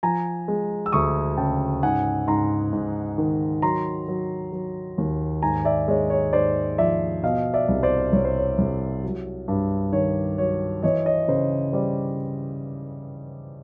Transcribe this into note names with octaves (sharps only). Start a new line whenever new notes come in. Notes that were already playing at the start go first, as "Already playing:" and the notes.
F3 G#5 A#5
G#3
E6
D2 C#6 D#6
C#3 G5 A5
G#2 F#5 G#5
G#2 A#5 C6
G#2
D#3
F#3 A#5 C6
F#3
F#3
D#2
G#2 G#5 A#5
D5 E5
G#3 C#5 D#5
C#5
G#2 C5 D5
F3 D5 E5
B2 D#5 F5
D5 E5
C2
C5 D5
C2 C#5
C5
C#5
C2
F#3
G2
D#3 C#5
F#3 C#5
E3 C#5 D#5
C#5 D#5
C#3 C5
G3 C5 D5